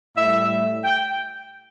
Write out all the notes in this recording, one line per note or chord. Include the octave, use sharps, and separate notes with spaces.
A2 G3 E5
G5